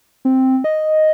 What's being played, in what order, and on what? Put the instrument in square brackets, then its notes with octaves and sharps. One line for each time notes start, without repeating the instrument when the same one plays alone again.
[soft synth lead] C4
D#5